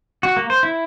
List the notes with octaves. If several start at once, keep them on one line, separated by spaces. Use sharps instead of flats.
F#4
A#3
C5
E4